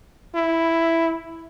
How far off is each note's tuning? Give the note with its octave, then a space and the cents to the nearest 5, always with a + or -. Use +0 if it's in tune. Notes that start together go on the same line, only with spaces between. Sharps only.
E4 +0